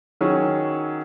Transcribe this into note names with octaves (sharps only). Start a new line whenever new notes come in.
D#3 F#3 C#4 G#4